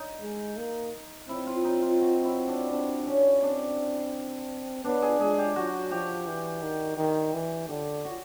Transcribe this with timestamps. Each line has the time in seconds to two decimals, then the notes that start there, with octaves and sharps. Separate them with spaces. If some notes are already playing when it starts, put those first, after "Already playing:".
Already playing: D#4
0.22 G#3
0.57 A#3
1.28 C4 E4
1.46 F4
1.64 D#4
1.82 F4
2.00 F#4
2.24 E4
2.47 D4
2.71 C4 D4
3.07 C#4
3.42 C4 D4
4.85 B3 D4
5.02 G#4
5.20 G#3 G#4
5.38 G4
5.56 F#3 F#4
5.91 F3 G4
6.27 E3
6.62 D#3
6.98 D#3
7.33 E3
7.69 D3 G4
8.05 F#4